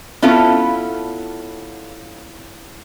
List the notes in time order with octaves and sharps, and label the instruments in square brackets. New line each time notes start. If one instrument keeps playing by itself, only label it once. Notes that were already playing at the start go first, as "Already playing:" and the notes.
[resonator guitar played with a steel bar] B3 C#4 E4 F4 A4